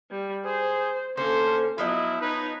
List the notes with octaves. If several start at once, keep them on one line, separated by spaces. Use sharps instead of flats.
G3
G#4 C5
D3 A#3 C#4 A4 C5
F3 F#3 B3 E4 D#5
D#4 B4 C#5